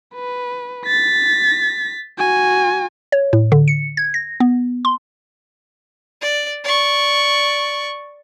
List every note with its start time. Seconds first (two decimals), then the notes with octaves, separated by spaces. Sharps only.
0.15 B4
0.87 A6 B6
2.18 F#4 G#5
3.12 C#5
3.33 A2
3.52 D3
3.68 C#7
3.97 G#6
4.14 A#6
4.40 B3
4.85 C6
6.21 D5
6.64 D5 C#6